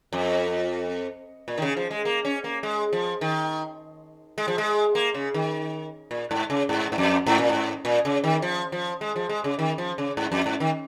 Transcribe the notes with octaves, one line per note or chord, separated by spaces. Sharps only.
F2
A#2
D#3
C#3
F3
G#3
A#3
C#4
A#3
G#3
F3
D#3
G#3
F3
G#3
A#3
C#3
D#3
A#2
G#2
C#3
G#2
G#2
F2
G#2
A#2
G#2
A#2
C#3
D#3
F3
F3
G#3
F3
G#3
C#3
D#3
F3
C#3
G#2
F2
G#2
D#3